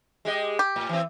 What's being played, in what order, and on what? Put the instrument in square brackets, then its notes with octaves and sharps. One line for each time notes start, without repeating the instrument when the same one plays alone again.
[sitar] G#3 G4 D#5
[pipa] G4
[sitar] A2
E3 C4